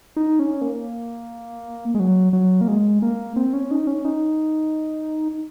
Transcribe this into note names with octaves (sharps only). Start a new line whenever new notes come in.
D#4
C#4
A#3
G#3
F#3
F#3
A#3
G#3
A#3
C4
C#4
D#4
C#4
D#4